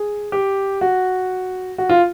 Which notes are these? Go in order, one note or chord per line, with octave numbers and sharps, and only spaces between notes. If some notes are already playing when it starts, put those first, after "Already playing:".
Already playing: G#4
G4
F#4
F#4
F4